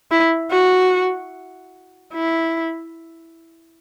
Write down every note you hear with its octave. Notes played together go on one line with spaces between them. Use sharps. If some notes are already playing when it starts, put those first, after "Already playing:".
E4
F#4
E4